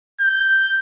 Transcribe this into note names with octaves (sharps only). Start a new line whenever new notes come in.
G6